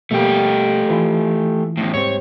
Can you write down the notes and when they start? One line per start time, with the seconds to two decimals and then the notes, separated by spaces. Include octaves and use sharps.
0.11 B2 G3 A3 A#3 G4
0.89 E3 F4 B4
1.77 E2 A2
1.94 G#2 G3 C4 C#5